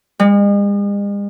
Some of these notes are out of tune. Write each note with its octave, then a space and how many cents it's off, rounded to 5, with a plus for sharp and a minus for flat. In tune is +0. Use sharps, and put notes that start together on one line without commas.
G#3 -45